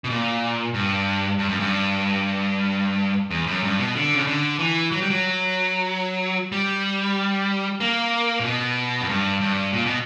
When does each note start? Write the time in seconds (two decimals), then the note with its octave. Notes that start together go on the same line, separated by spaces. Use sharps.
0.04 B2
0.10 A#2
0.74 G2
1.39 G2
1.49 F#2
1.60 G2
3.30 E2
3.47 F#2
3.64 G2
3.79 B2
3.96 D3
4.15 C#3
4.27 D3
4.59 E3
4.92 F#3
5.01 G3
5.10 F#3
6.52 G3
7.80 A#3
8.40 A#2
8.44 B2
9.01 F#2
9.09 G2
9.41 G2
9.73 A#2
9.85 B2